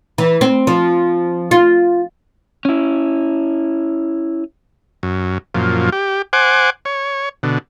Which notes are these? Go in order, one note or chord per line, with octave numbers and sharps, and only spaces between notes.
E3
C4
F3
F4
C#4 E4
F#2
F#2 A#2 F3
G4
C5 F#5 G#5 D6
C#5
B2 D3